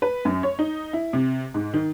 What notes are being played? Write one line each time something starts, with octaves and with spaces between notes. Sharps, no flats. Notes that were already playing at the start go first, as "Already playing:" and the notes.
B4
F#2
C#5
D#4
E4
C3
G#2
D#3